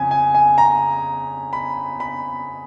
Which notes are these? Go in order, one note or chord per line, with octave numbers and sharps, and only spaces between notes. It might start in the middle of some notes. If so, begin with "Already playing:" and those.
Already playing: F2 C#3 G#5
G#5
G#5
A#5
B5
B5